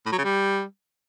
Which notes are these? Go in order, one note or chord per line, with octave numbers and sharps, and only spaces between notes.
A2
F#3
C#3
G3